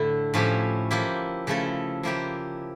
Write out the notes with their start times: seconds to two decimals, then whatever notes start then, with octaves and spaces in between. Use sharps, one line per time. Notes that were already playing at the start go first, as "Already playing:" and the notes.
Already playing: A2 D3 A3 E4
0.34 A2 F3 C#4 E4 G4
0.91 F3 A#3 E4 G4
1.47 C#3 F3 A3 E4 A4
2.03 F3 A#3 E4 G4